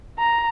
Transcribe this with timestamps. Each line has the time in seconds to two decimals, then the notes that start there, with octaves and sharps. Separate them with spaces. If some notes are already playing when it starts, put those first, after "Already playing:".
0.19 A#5